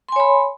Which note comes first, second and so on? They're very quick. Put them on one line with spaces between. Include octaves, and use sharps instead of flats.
C6 G#5 C#5 B5